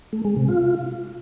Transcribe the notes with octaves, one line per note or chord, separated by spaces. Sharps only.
A3
G#3
C3
F4